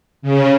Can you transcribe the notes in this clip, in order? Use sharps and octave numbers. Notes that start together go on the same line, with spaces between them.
C#3